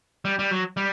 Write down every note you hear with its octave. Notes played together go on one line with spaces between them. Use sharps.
G3
G3
F#3
G3